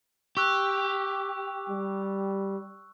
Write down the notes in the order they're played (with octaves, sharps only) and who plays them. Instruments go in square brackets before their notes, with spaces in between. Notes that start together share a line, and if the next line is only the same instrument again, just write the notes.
[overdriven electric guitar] G4 [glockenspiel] C#6 E6 F#6
[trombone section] G3